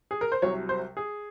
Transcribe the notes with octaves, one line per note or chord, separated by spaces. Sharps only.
G#4
A#4
C5
C2 C3 F#3 C#5
C5
G#4